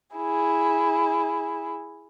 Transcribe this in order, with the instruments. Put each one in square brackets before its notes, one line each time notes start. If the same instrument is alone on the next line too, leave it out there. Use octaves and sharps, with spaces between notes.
[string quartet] E4 G#4